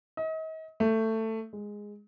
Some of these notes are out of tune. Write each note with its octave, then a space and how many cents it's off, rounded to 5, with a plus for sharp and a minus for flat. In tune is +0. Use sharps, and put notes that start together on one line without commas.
D#5 +40
A3 +15
G#3 -5